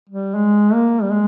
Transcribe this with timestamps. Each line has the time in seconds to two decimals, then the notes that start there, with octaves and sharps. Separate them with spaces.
0.09 G3
0.35 G#3
0.73 A#3
1.02 G3
1.12 G#3